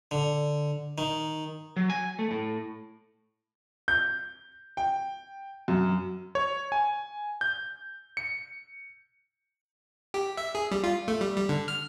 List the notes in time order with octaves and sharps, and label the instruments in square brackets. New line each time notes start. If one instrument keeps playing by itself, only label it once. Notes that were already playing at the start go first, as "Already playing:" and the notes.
[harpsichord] D3
D#3
[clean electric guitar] F#3
G#5
A3
A2
[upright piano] G6
G5
F#2
[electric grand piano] C#5
G#5
G6
C#7
[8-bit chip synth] G4
E5
G#4
G3
F4
A3
G3
G3
D3
F6